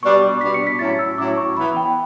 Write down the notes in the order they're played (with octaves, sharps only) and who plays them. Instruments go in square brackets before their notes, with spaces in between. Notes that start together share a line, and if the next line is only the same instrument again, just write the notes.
[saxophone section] B2 G3 D4 [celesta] C#6
[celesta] D6
[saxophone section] B2 G3 D4 [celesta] B6
[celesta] C#7
B6
[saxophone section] A2 F#3 C#4 E4 [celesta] A6
[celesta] E6
[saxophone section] A2 F#3 C#4 E4 [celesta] D6
[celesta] C#6
[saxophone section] E3 B3 E4 [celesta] B5
[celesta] G5